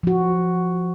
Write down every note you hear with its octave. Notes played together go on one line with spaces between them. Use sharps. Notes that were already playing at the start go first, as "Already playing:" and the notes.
F3 F#4